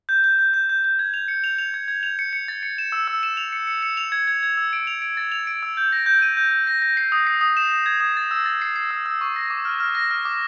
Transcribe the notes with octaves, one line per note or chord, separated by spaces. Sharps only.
G6
G6
G6
G6
G6
G6
G#6
F7
C#7
F7
F7
G#6
G#6
F7
C#7
C#7
A6
C#7
E7
E6
E6
E7
F7
C#7
C#7
C#7
F7
G#6
G#6
G#6
E6
D7
F7
D7
A6
F7
D7
E6
G6
A#6
G6
D#7
G6
G6
A#6
A#6
C7
D#6
C7
D#6
E7
D#6
G#6
D#6
A6
E6
A6
C7
C7
E6
E6
C#6
A#6
D6
F6
F6
A#6
F6
D6